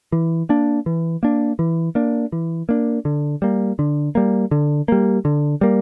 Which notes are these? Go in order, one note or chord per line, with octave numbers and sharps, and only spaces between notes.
E3
A#3 D4
E3
A#3 D4
E3
A#3 D4
E3
A#3 D4
D3
G3 A#3
D3
G3 A#3
D3
G3 A#3
D3
G3 A#3